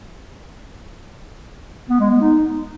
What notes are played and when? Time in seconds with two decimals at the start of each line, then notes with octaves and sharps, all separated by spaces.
1.89 B3
2.00 G#3
2.10 B3
2.20 D#4